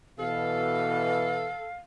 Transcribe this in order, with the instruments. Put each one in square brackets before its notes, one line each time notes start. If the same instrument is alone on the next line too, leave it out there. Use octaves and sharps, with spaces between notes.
[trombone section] B2 E3 [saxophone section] A4 [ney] F5